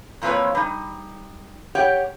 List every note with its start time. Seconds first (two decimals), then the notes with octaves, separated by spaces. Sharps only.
0.22 F2 A#2 E3 F3 B4 C#5
0.55 G3 D#4
1.75 G4 C#5 F#5 G5